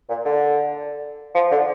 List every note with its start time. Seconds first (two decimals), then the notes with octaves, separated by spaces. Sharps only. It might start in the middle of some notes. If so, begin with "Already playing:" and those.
0.09 A#2
0.25 D3
1.35 F3
1.51 D3